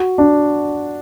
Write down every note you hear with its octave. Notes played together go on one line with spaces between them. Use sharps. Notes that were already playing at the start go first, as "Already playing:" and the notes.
Already playing: F#4
D4